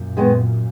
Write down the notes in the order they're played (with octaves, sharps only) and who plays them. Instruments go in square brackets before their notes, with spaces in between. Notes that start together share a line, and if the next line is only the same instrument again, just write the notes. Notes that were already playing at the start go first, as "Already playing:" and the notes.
Already playing: [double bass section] F#2 A#2
[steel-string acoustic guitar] D#3 G#3 B3